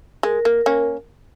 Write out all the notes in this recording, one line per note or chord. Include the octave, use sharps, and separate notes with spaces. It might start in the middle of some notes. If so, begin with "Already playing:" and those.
G#3 A#4
A#3
A#3 C#4